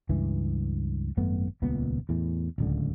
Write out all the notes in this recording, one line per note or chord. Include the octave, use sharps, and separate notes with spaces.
C#2 G2 E3
G#1 F#2 A3 B3
D#1 C#2 A#2 B3
E2 A2 E3
D1 C#2 D3